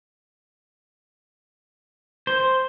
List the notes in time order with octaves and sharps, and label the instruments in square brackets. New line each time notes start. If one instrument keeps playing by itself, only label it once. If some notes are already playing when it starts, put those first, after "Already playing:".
[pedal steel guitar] C5